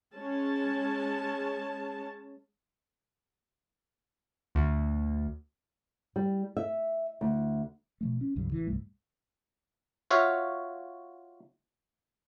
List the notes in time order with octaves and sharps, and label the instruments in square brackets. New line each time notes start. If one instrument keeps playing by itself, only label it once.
[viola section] G#3 C#4 A5
[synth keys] D2
[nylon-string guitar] G3
E5
D2
[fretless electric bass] B2 F3 A3
C#4
C#2 G2 C#3 F#3
A1 E3
C2 G2 G3 A3
[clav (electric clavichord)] F4 F#4 C#5 E5 F5